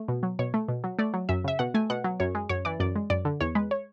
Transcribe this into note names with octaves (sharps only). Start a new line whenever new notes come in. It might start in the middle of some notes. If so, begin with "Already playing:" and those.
Already playing: A3
B2
F#3
B2 C#5
A3
B2
F#3
A3 D5
F#3
F#2 E5
C#3 E5
B2 F#5
A3 G#5
B2 F#5
F#3
F#2 C#5
G#3
F#2 C#5
E3 D5
F#2 D5
G#3
F#2 D5
D3
E2 C#5
G#3 B4
C#5